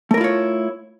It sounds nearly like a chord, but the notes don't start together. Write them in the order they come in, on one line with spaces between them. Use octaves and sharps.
A3 A#4 E4 F4 C#5